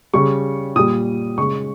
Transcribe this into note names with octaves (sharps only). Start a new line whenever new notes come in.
C#3 G3 C#6
A#2 G3 D#6
C#3 G#3 C#6